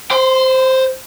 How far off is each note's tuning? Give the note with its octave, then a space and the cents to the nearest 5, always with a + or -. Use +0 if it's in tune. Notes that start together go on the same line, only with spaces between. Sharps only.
C5 +0 C6 -40